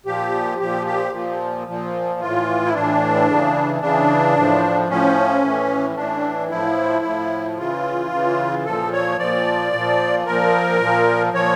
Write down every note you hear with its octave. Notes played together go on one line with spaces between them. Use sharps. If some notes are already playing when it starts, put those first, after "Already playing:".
A#2 F3 G4
A#2 F3 G4
G4
A#2 F3
A#2 F3
A2 E3 F4
E4
A2 E3 D4
C#3 E3
C#3 E3 D4
A2 F3
A2 F3 C#4
A2 E3
A2 E3 D4
A2 F3 E4
A2 F3
C#3 E3 F4
C#3 E3
A#2 F3 A4
C#5
A#2 F3 D5
A#2 F3
A#2 F3 A#4
A#2 F3
A#2 F3 C#5